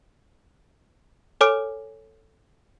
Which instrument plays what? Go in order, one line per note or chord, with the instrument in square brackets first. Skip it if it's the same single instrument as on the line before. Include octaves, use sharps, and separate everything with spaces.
[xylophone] A4 C#5 G#5 D6 F6 D7